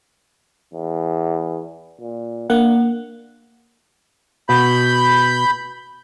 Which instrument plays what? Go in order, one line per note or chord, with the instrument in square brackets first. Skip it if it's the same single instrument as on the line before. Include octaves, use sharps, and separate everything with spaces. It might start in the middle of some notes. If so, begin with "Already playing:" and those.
[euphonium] E2
A#2
[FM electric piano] A#3 F#5 [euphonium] D4
[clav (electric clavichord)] B2 [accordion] B5 G6